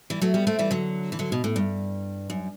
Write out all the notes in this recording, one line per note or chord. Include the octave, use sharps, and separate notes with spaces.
E3 G3
F#3 A3
G3 B3
A3 C4
E3 G3
D3 F#3
E3
D3 F#3
B2
A2
G2
F#2